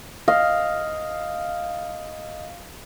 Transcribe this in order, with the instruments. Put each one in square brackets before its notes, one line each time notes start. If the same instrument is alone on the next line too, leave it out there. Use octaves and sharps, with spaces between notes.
[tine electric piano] D#5 [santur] F5